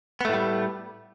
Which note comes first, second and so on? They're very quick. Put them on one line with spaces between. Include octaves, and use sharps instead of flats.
B3 A3 A2 G3